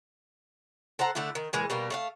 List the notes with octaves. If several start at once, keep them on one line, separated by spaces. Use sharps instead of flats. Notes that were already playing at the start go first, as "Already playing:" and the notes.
A4 C5 F#5 A#5
D3 A3 D4 E4
D#3
A#2 E3 G#3
B2 G3 A#3
A3 D5 F5